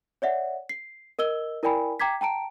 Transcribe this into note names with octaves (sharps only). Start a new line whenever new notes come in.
C#5 D5 E5 F#5
C7
A#4 D#5 E6 G7
E4 A#4 D5 G5 G#5 B5
G5 A#5 D6 G#6 B6
G5 A5 A#5 D7